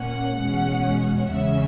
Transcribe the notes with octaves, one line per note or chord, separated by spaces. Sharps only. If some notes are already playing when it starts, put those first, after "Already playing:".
Already playing: A#2 A#3 C#4 F#5
E2 B2 G#3 C#4
E2 C#3 G#3 C#4 E5